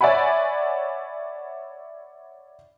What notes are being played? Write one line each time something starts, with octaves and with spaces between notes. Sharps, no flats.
C#5 D5 E5 F#5 G#5 B5